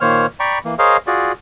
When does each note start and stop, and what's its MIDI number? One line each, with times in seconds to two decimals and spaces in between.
0.01 0.26 46
0.01 0.26 51
0.01 0.26 58
0.01 0.26 72
0.01 0.26 73
0.01 0.26 89
0.40 0.59 74
0.40 0.59 79
0.40 0.59 82
0.40 0.59 83
0.40 0.59 85
0.65 0.75 52
0.65 0.75 58
0.79 0.97 68
0.79 0.97 70
0.79 0.97 72
0.79 0.97 73
0.79 0.97 75
0.79 0.97 77
1.07 1.32 65
1.07 1.32 66
1.07 1.32 68
1.07 1.32 74